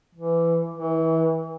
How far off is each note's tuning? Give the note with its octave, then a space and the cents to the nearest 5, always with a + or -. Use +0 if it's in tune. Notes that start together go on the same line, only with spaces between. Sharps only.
E3 +20
E3 -25